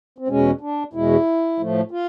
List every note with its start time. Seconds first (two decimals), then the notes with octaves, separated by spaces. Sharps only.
0.18 C4
0.28 E2 B2 G#3 C#4
0.61 D4
0.93 E2 B2 G#3 E4
1.59 A2 F3 A3
1.91 F4